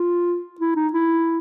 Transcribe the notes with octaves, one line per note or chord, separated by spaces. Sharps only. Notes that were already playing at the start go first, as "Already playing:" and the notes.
Already playing: F4
E4
D#4
E4